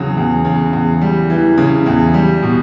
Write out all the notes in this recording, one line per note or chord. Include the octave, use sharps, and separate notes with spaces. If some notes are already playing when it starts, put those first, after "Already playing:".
Already playing: E2 C#3 F#3
E2
C#3
E2
G3
E3
C#3
E2
G3
B2